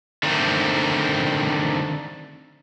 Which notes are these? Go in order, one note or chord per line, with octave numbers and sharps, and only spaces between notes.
D3 D#3 A3 C4